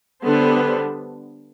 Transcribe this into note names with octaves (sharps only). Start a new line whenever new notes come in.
D3 G3 B3 D4 A4 C5